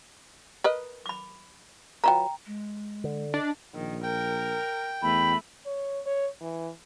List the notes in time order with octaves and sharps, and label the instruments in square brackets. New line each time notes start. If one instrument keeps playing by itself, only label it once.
[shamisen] A#4 B4 D#5
[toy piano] B5 D6
[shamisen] F#3 F4 B4 [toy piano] G5 A#5
[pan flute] G#3
[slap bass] D3
[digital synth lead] D4 [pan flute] D#5
[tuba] A#1 [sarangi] D#3
[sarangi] A#4 [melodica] G5
[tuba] E2 [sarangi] A3 [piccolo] B5
[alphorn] C#5
C#5
E3